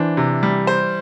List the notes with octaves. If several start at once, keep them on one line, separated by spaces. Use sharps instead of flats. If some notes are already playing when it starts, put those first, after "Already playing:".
Already playing: E3 D4 C5
C3
G3
C5